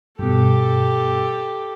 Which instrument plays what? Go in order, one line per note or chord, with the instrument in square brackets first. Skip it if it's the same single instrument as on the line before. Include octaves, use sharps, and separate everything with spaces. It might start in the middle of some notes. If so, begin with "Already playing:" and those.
[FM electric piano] G2 B2 [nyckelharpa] G4 A4